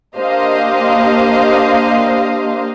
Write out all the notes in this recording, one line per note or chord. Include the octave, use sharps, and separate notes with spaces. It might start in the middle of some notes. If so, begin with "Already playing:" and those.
A#3 D4 G4 C5 D#5 F5